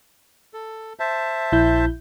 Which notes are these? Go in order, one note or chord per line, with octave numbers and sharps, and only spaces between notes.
A4
C5 E5 A5
A#1 E4 G6